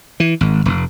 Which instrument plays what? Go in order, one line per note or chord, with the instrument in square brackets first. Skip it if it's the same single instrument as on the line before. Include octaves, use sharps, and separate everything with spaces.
[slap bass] E3
G#1
F1